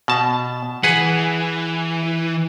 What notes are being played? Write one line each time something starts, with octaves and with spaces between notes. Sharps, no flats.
B2 A5
E3 G#4 B4 F#5